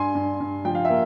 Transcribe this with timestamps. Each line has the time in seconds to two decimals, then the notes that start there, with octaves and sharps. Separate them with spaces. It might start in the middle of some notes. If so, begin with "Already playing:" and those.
Already playing: G2 G#5 C6
0.15 G2
0.40 G2
0.65 F3 G5
0.75 F5
0.85 A#3 E5